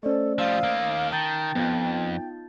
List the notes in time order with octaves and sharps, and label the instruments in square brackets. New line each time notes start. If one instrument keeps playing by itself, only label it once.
[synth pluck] A3 C#4 [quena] A4 [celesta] C5 D5 D#5
[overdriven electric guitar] F3 G3 [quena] F5 [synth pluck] D#6 E6
[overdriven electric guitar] D#2 A#3
[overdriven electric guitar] D#3 [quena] G5 [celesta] A5 G6 A6
[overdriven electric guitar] F2 [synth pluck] B3 D#4 F4